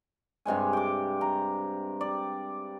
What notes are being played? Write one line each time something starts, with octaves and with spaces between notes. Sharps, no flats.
G2 C3 G#3 G#5
G5 D6
A#5
D5